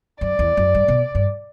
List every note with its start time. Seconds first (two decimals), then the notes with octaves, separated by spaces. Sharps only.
0.21 F#2 D5
0.39 E2
0.57 F#2
0.75 G2
0.88 B2
1.15 G2